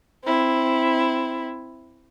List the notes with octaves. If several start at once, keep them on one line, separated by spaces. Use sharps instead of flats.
C4 E4